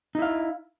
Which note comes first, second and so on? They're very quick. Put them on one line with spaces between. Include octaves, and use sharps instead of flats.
D#4 E4 F5